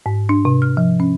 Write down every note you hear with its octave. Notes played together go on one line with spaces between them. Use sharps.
G#2
D4
C3
F6
F3
C#4